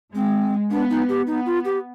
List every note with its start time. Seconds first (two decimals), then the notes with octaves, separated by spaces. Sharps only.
0.14 G#3 C4
0.71 B3 D4
0.90 D#4
1.09 G4
1.27 B3 D#4
1.46 F4
1.65 G4